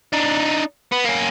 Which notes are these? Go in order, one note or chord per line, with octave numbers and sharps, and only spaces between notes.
D4 D#4
B3
A#3 C#4